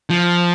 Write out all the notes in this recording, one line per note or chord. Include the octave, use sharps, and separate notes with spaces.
F3